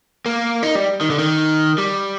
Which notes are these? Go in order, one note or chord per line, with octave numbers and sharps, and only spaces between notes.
A#3
D#4
G3
D#3
D3
D#3
G3